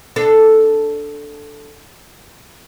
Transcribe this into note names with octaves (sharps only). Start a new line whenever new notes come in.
D4 A4